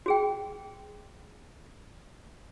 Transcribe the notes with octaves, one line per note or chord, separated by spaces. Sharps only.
F#4 G#4 G5